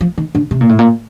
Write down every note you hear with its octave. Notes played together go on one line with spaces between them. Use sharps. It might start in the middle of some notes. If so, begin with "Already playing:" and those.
F3
D#3
D3
C3
A#2
A2
A#2